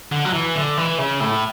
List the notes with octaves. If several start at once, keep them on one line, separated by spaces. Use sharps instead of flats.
D3
F#3
E3
D3
E3
C#3
A2